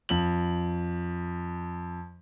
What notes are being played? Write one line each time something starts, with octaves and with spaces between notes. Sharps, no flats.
F2 F#7